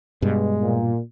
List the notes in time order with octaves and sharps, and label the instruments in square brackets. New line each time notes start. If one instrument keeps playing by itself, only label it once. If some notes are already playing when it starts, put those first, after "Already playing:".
[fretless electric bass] G2 B2 [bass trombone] G#3
[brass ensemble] A#2